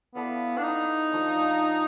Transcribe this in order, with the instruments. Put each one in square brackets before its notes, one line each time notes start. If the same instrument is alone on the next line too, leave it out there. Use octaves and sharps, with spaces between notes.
[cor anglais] B3 [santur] E4 A4 D5 F5
[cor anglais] D4
D#4
[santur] F3 A3 D4